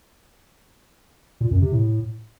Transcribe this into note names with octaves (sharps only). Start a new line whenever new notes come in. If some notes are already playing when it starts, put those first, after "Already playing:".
A#2
F#2
C3
A2